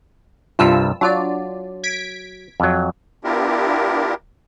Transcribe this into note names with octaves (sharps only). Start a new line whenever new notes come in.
C2 G2 F4 A5 E6
F#3 D4 F4 D5
G#6 B6 D7
F2 F#3
B3 D4 E4 F4 G4 A#4